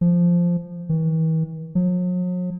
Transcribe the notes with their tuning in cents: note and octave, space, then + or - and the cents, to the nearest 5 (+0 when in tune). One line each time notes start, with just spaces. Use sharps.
F3 -5
E3 -45
F#3 -45